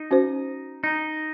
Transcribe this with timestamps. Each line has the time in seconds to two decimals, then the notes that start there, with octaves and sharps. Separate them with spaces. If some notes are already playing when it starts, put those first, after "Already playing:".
Already playing: D#4
0.11 C#4 F#4 C5
0.84 D#4